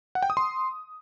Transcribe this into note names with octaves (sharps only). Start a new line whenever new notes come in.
F#5
G5
D#6
C6